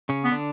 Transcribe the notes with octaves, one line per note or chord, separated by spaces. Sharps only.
C#3 C#4
B3
D3 D4